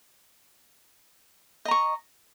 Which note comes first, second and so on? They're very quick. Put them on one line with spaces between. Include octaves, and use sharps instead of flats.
D#5 A#5 C#6